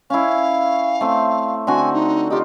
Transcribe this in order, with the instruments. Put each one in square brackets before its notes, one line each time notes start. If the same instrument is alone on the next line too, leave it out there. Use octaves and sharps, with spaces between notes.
[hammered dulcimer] C#4 E4 [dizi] F5
[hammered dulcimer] A3 C4
[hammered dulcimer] D3 C4 F#4 [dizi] G#5
[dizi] D#4
[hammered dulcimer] D#4 F4 [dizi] G4